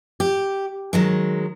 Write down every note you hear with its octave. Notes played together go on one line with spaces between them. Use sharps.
G4
D#3 F#3 G#3